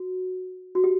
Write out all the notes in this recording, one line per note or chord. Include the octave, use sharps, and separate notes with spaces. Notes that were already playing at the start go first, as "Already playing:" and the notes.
Already playing: F#4
F#4
G4